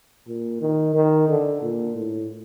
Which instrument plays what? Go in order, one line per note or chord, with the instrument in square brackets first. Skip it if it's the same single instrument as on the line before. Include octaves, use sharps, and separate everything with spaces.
[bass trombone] A#2
D#3
D#3
D3
A#2
A2